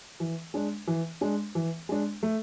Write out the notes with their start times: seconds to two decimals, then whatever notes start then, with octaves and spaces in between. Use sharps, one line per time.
0.20 E3
0.54 G#3 D4
0.87 E3
1.21 G#3 D4
1.55 E3
1.89 G#3 D4
2.23 A3